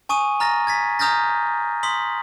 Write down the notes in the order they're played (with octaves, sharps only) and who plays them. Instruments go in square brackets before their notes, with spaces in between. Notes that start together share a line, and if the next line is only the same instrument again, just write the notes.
[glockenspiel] G#5 C#6 D#6 D#7
A#5 F6 A6 A#6
G#6 A6 B6
A#5 D#6 F6 G6 A6 A#6
C6 D#6 B6 F#7